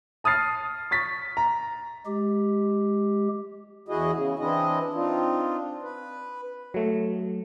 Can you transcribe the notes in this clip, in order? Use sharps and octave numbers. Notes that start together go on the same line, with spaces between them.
A5 D#6 F6 A6 C7
C#6 A6 B6
A#5
G#3 G4
E2 E4 F#4 G#4 D#5
C#3
E3 C4 D4 E4 D#5
C4 D4 D#4 F4
B4
F#3 A3